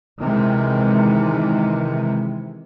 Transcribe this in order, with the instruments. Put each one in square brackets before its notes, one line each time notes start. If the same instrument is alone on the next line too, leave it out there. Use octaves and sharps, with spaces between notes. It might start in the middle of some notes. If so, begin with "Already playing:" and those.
[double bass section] C3 D#3 E3 G#3